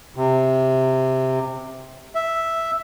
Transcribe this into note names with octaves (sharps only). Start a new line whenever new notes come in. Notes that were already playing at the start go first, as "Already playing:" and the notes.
C3
E5